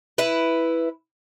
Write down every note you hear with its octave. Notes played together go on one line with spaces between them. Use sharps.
E4 B4